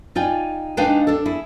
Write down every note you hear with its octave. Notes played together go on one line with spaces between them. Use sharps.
D#4 F4 D5 G5 G#5
G#3 D4 D#4 B4 F5 G5
D4 A4
E4 G#4